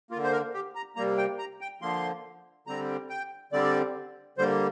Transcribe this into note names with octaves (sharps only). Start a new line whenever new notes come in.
A#3 F4
D3
C5
A#4
G4
A#5
C3 G3 A#3 A#5
G5
A#5
G5
D3 F3 A#3 C6
D3 G3 C4 A#5
G5
D3 G3 C4 D5
D3 G3 A#3 C5